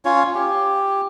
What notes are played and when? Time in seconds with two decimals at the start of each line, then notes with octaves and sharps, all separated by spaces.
0.05 C#4 F4 C#5
0.35 G4